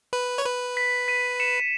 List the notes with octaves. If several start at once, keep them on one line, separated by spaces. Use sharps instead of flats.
B4
C#5
B4
B6
B6 D#7
C#7 E7